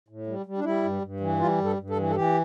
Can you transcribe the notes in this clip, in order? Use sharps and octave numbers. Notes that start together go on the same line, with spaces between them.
A2
G3
G3
D4
G3 E4
G2
G2
E3
G3 F4
G2
A4
G2
A4
E3
A4
E3 G4